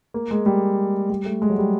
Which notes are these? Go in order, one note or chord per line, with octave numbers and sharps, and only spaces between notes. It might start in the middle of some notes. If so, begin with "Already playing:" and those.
A#3
G#3
G3
G3
A3
G#3
F#3
G3